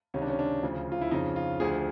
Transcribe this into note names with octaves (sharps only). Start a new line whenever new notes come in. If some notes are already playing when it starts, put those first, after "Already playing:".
C#2 C3 D#3 C#4
D4
C#4
D4
D2 C#3 F3
F4
E4
F2 C#3 F3 D#4
F4
D2 D3 F3 G#4